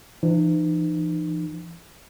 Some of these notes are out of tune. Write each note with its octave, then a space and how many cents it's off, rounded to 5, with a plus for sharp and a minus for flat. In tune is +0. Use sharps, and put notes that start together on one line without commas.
E3 +40 D#4 -35